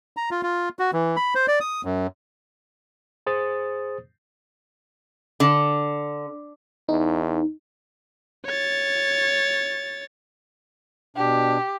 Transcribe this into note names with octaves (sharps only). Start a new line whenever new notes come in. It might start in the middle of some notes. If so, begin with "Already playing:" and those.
A#5
F4
F4
F#4
E3
B5
C5
D5
D#6
F#2
G#4 C5 D#6 A6
D3
E2 D#4
C#5 A6
B2 D4 G4